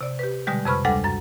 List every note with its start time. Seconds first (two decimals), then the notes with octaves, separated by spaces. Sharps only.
0.01 C3 D5
0.19 G4 B4
0.47 B2 D3 G3 G#3 G6
0.65 F2 C3 B4 B5 C#6 F6
0.85 D2 G3 G#3 A4 F#5 D6
1.04 F#2 A6